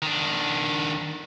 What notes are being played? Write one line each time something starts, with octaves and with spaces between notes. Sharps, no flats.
D#3 D4